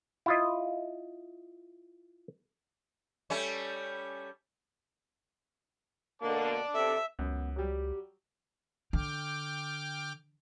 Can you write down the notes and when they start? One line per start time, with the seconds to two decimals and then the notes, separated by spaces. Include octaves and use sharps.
0.26 E4 F4 D#5
3.30 G3 A3 C#4
6.22 B2 D3 A#3 D5 A5 D6
6.75 C3 C4 A4 E5
7.19 C#2 F#2 B3
7.56 F#3 G3 G4
8.93 D3 G5 D6 F6